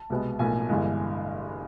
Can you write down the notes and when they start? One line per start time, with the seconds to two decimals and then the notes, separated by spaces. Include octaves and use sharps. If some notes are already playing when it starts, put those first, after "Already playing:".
Already playing: A5
0.10 C2 B2 G#3 B3
0.39 B1 A2 F3 A#3 G#5
0.69 G1 G2 E3 G#3